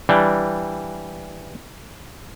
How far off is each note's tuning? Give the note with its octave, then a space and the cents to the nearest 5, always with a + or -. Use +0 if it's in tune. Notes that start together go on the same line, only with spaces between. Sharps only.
E3 +0 G3 +0 D4 +0